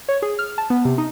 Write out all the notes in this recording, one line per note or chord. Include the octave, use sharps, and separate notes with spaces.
C#5
G#4
F6
A5
B3
C3
D#4